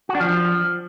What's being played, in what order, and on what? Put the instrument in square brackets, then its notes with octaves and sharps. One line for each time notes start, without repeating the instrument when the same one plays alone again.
[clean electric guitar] F#4
D4
F3